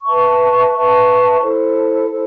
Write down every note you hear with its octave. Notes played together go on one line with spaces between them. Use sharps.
B4 E5 A5 C#6
B4 E5 A5 C#6
E4 A4 C5
E4 A4 C5